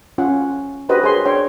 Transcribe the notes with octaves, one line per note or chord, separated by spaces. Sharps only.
C#4 F4 F#5
D4 F#4 G4 B4 C5 D#5
G#4 A#4 C#5 D#5 C6
D4 B4 C#5 G5 C6